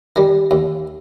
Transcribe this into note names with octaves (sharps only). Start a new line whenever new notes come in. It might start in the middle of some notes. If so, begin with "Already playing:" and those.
D#3 G3
D#2